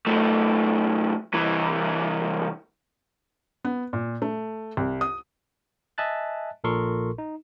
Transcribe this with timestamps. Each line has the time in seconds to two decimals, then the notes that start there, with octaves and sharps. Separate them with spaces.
0.06 F#2 A3
1.33 C2 E3
3.64 B3
3.93 A#2
4.22 A3
4.77 C2
5.01 D#6
5.98 D#5 E5 G#5 A5 F#6 A6
6.64 A#1 A#2 A4 A#4 C6 C#6
7.18 D#4